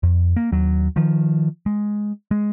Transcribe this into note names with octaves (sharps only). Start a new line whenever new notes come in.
F2
A#3
D#2 F#3
D#3 F3
G#3
G#3